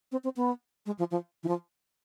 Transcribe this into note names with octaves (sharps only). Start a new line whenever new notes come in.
C4
C4
B3
G#3
F3
F3
E3
F3